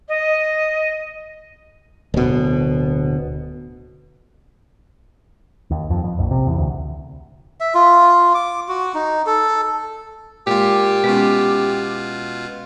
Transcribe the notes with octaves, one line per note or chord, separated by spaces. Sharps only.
D#5
D1 B2
D#2
F2
F2
A#1
C3
E2
D2
E5
F4
D6
F#4
D#4
A4
A#2 G#3 F4 G4
B2 G#3 B3 C#4 F4